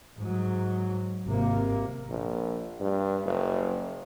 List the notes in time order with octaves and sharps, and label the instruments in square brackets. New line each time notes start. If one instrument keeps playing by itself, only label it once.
[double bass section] G#2 F#3
G#1 C3 A#3
[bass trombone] A#1
G2
F#1